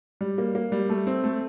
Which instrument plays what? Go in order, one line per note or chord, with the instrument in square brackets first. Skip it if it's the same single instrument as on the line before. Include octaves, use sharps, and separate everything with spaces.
[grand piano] G3
A#3
A#3
G3
A3
C4
A3